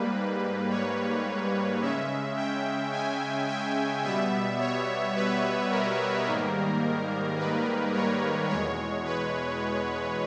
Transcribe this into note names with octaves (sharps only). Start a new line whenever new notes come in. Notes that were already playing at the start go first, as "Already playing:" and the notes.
Already playing: G#2 G3 A#3 B4
C#5
C#3 G#3 C#4 E5
G5
G#5
G5
B2 G3 B3 E5
C#5
B4
A#4
G#2 D#3 G3 A#3
B4
C#5
E2 B2 G#3 C#5
B4